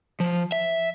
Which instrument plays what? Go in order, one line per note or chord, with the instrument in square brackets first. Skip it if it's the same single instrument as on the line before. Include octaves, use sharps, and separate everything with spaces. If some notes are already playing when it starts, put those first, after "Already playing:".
[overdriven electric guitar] F3
E5